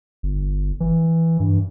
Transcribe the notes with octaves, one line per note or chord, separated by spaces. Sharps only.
G1
E3
G2